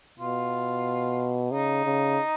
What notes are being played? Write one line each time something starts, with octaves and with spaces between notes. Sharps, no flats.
B2 F4
C#3 D#4
C#3